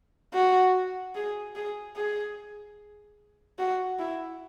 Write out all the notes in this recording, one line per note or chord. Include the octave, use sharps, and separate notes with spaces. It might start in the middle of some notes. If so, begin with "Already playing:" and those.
F#4
G#4
G#4
G#4
F#4
E4